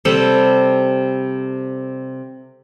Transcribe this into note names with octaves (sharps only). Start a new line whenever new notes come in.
C3 G3 A4